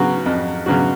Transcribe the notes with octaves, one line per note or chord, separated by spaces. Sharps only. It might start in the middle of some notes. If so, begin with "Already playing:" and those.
Already playing: C#3 F#3 B3 F#4
F2
C#3 F#3 B3 F#4